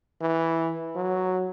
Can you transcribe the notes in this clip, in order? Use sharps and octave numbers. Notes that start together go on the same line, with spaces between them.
E3
F#3